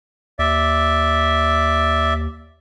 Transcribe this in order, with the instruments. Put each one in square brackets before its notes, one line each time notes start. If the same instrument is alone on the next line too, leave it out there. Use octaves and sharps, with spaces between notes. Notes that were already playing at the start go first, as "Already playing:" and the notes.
[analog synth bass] D#2 [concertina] D5 E5